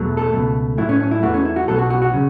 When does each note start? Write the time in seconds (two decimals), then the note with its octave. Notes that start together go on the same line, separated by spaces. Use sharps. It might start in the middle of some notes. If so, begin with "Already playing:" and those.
Already playing: E2 B2 F#3 A3
0.17 A4
0.33 C#2 B2 A3
0.77 A2 F#3 A3 E4
0.89 C#4
1.00 C#4
1.11 E4
1.23 E2 E3 A3 F#4
1.34 C#4
1.45 E4
1.56 F#4
1.68 B1 B2 F#3 A4
1.79 F#4
1.90 F#4
2.02 F#4
2.13 C#3